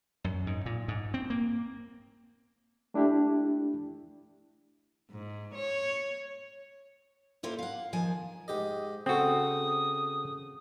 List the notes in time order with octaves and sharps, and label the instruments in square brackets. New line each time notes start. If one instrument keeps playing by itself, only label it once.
[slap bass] F#2
G#2
A#2
G#2
C4
A#3
[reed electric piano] A3 D4 E4 G4
[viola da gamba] G#2
C#5
[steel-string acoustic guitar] A#3 E4 F4 A4 C5
F5 F#5
D#3 F3 G#5
[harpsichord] G#2 G4 D#5
[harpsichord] C#3 A4 [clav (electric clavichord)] C4 F#4 [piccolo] D#6